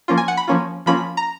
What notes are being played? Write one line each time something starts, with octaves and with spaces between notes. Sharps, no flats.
F3 A#3 C#4 F4
G#5
F#5
B5
F3 A#3 C#4 F4
F3 A#3 C#4 F4 B5
A#5